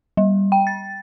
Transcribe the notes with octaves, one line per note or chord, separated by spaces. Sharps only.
G3
G5
A6